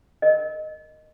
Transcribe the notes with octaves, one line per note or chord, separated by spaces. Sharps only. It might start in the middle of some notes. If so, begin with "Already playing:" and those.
A#4 D#5